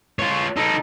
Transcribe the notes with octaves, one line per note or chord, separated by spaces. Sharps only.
F4 C#5
D#4 A4